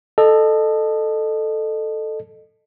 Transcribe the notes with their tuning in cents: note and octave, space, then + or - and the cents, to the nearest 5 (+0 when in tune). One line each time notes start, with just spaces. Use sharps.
A4 +0 D#5 -30